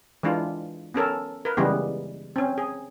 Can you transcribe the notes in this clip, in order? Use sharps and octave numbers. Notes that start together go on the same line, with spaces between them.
E3 G#3 D4 F4
B3 C#4 A4 A#4
A#4 B4
C#3 E3 G3 G#3 B3
C4 C#4
G#4